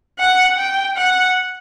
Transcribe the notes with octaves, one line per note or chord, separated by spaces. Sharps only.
F#5
G5
F#5